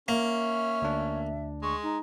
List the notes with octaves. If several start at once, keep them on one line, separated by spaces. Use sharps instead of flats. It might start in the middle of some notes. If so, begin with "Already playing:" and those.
A#3 C#4 E5
D2 D4
G#3 C#6
D#4